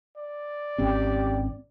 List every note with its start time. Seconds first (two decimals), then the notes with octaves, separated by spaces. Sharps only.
0.16 D5
0.78 G#1 C4 C#4 G4